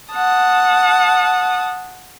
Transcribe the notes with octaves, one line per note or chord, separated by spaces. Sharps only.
F#5 A5 D#6